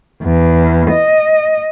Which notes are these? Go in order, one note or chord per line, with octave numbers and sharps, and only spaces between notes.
E2
D#5